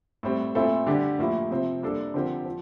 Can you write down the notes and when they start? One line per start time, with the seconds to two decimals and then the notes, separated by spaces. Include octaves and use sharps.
0.23 A2 G3 C4
0.55 A#2 A3 C4 E4 A4
0.87 D3 G3 D4 G4
1.19 A2 F3 A#3 E4 G4
1.51 C3 F3 C4
1.82 G3 A#3 D4 A4
2.14 D3 F3 C4 G4 A#4
2.46 F3